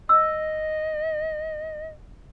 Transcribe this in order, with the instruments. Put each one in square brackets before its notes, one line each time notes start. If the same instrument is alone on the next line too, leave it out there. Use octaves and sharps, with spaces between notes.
[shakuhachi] D#5 [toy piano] E6